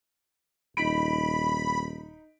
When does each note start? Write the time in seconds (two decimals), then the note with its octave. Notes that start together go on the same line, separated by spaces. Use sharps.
0.77 D#1 D#4 B5 B6 D7